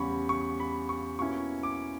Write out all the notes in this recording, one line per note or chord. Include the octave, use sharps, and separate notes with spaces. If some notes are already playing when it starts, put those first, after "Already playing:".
Already playing: E2 C#3 G3 C#4 B5 C#6
C#6
B5
C#6
B2 A#3 C#4 E4 C#6
D6